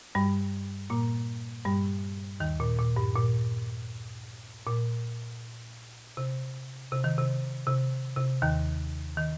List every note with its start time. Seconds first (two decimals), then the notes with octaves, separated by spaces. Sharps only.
0.15 G2 G3
0.90 A#2 A#3
1.65 G2 G3
2.40 D#2 D#3
2.60 A#2
2.79 A#2
2.97 G2
3.16 A#2
4.67 A#2
6.17 C3
6.92 C3
7.04 D#3
7.18 C3
7.67 C3
8.17 C3
8.42 D#2 D#3
9.17 D#3